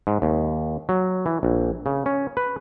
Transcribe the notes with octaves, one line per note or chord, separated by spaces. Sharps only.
G#2
D#2
F#3
E3
A#1
C#3
C#4
B4